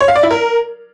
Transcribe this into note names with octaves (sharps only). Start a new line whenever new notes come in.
C#5
F5
D5
E4
A#4